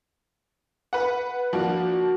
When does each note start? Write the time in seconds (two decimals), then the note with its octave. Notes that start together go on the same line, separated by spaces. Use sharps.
0.93 B4 F#5
1.53 F3 A#3 D4 F#4